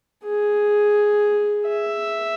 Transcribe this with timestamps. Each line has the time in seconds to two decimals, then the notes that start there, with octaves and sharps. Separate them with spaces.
0.25 G#4
1.68 E5